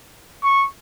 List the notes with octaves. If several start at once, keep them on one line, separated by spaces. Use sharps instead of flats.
C#6